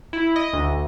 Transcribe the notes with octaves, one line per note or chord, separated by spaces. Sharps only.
E4
D#5
D2